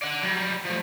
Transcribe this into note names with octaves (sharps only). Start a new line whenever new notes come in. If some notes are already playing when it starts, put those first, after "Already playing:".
D5 F#5
F#3 G3
F3 A3